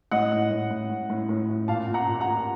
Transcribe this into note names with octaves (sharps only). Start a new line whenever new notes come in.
A2 D#5 F#5
A2
A2
A2
A2
A2
A2
A2
A#2 F5 A5
A#2
F#5 A#5
A#2
F#5 A#5
A#2